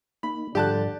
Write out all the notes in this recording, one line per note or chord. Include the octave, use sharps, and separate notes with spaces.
A#3 D#4 B5
G#2 D3 F3 G3 D4 G4 A5 F#6